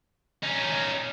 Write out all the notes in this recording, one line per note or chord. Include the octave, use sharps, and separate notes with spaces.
C#4 D#4